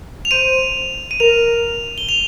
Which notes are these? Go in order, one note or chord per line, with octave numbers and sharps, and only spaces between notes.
F7
C5 D#7
D#7
A#4 F7
G7
F7